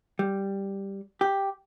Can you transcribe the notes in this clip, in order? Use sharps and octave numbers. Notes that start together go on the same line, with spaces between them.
G3
G4